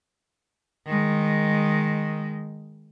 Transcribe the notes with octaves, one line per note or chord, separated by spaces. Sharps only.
D#3 G#3